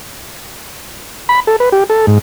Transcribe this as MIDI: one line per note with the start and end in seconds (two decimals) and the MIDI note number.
1.29 1.40 83
1.47 1.56 69
1.60 1.69 71
1.72 1.84 67
1.90 2.06 69
2.07 2.18 44